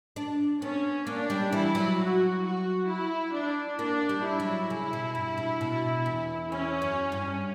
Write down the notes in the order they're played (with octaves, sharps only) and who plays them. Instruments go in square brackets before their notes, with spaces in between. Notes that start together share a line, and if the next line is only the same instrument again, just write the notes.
[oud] D4
[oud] B3 [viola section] C#4
[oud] A#3 [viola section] D4
[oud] G3
[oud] E3 [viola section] E4
[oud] F#3
[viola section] F#4
F#4
E4
D4
[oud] A#3 [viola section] D4
[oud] G3
[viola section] E4
[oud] F#3
C#3
B2
G2
B2
B2
E2
[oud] E2 [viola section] C#4
[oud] F#2
G2